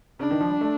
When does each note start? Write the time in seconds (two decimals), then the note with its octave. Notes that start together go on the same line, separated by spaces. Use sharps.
0.19 C#3 D4
0.31 D#3
0.40 F3
0.50 G3
0.61 A3